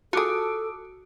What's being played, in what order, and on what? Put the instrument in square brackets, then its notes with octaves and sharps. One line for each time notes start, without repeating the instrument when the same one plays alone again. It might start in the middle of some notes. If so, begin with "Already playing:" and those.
[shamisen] F4 G#4 [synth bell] F#4 D7 [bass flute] A4 [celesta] A5 D6 D#6